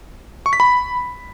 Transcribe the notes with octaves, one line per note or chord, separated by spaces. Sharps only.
C#6
B6
B5